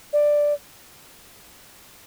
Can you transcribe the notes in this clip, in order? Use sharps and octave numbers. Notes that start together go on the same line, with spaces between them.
D5